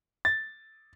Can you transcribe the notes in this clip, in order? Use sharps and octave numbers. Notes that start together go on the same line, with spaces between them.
A6